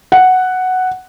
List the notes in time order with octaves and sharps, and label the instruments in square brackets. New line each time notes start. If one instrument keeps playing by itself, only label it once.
[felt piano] F#5